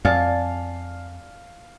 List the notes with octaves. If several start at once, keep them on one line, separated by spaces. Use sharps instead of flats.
F2 D5 F5 G#5 A5